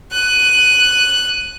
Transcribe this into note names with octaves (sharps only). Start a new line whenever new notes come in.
F#6 D#7